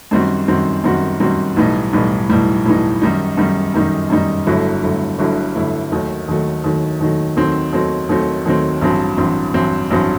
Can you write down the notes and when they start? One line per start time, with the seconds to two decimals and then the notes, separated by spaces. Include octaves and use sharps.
0.11 F#2 D#3 G3 C4 F#4
0.48 F#2 D#3 G3 C4 F#4
0.84 F#2 D#3 G3 C4 F#4
1.20 F#2 D#3 G3 C4 F#4
1.56 B1 A2 E3 G3 D#4
1.93 B1 A2 E3 G3 D#4
2.29 B1 A2 E3 G3 D#4
2.65 B1 A2 E3 G3 D#4
3.02 F#2 D#3 G3 D#4
3.37 F#2 D#3 G3 D#4
3.74 F#2 D#3 G3 D#4
4.10 F#2 D#3 G3 D#4
4.47 G1 G2 F#3 A3 E4
4.82 G1 G2 F#3 A3 E4
5.19 G1 G2 F#3 A3 E4
5.56 G1 G2 F#3 A3 E4
5.91 D#2 D#3 F#3 A3
6.28 D#2 D#3 F#3 A3
6.64 D#2 D#3 F#3 A3
7.01 D#2 D#3 F#3 A3
7.37 D#2 D#3 F#3 A3 C4
7.73 D#2 D#3 F#3 A3 C4
8.09 D#2 D#3 F#3 A3 C4
8.46 D#2 D#3 F#3 A3 C4
8.81 A1 G2 F#3 C4
9.18 A1 G2 F#3 C4
9.54 A1 G2 F#3 C4
9.91 A1 G2 F#3 C4